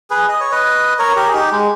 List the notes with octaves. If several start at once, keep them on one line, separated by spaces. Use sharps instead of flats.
G#4 B4
D#5
C#5
B4 D#5
A#4 C#5
G4 A#4
G#4
D#4 G4
G#3